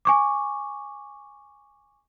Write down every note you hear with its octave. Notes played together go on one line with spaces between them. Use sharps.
G#5 C#6 D6